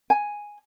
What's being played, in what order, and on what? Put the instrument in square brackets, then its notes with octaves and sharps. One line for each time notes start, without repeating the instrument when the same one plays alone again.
[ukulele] G#5